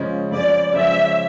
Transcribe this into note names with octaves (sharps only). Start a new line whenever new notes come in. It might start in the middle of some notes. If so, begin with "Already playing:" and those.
Already playing: C#3 F3 G#3 C#4
C#3 F3 G#3 C#4 D5
C#3 F3 G#3 C#4 E5